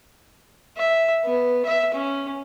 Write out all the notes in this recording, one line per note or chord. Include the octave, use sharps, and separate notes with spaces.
E5
B3
E5
C#4